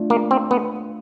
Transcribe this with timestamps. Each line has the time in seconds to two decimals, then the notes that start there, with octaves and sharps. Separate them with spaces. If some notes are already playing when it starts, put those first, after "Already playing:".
Already playing: A3 D4 F4
0.10 A#3
0.31 C4
0.51 B3